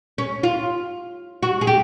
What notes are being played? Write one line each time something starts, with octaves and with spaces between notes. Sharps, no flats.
C#4
F4
F#4
G#4
G4